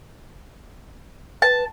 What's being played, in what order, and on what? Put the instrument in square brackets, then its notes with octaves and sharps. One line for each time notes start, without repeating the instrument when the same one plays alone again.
[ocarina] B4 [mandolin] A5